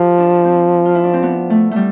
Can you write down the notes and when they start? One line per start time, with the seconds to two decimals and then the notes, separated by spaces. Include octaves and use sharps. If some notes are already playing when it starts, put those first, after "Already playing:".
Already playing: F3 F4 G4
0.18 D4
0.45 C4
0.85 F4
0.95 E4
1.04 D4
1.13 C4
1.23 B3
1.50 A3
1.71 G3 A3